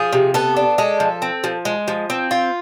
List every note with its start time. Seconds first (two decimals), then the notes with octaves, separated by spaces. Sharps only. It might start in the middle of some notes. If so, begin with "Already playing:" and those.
Already playing: F3 G#4
0.13 C3
0.34 B3 A4
0.57 D4
0.78 G#3 A4
1.00 F3
1.22 C4
1.44 F3
1.65 G#3
1.88 F3
2.10 C4
2.31 F4